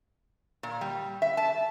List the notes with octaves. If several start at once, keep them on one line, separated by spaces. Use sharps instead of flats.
A#2
G3
E5
A5